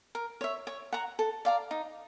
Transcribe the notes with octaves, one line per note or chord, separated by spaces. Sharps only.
A#4
C#5 E5
C#5
F#5 A#5 C#6
A4
D5 F5 A#5
D#4